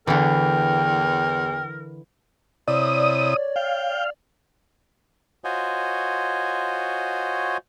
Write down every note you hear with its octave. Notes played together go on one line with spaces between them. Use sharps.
E2 D3 E3 A#4 G5
C3 E4 C#5 D5 D#6
F5 G5
F4 F#4 C5 C#5 D#5 G#5